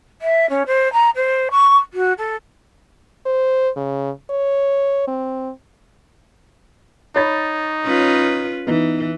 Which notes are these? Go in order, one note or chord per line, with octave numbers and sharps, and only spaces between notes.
E5
C#4
C5
A#5
C5
C#6
F#4
A4
C5
C#3
C#5
C4
D#4 C#5 B5 A6
C#4 F4 B4
E3 B3 D#4